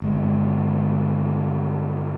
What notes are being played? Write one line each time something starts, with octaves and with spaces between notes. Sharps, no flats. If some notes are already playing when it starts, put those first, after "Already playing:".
G1 G#3